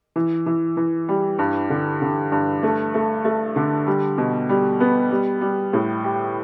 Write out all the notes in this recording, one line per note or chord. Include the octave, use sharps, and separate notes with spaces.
E3
E3
E3
G3
G2
D3
D3
G2
A3
A3
A3
D3
G3
B2
G3
B3
G3
G3
A2
G4